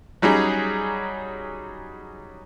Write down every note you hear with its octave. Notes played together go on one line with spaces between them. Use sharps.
F#3 G3 C#4 D#4 G#4